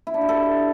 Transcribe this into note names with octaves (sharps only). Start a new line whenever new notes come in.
E4
D4
G4
A4